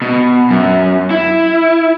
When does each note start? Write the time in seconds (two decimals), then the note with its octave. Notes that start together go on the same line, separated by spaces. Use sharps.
0.02 B2
0.50 F#2
1.11 E4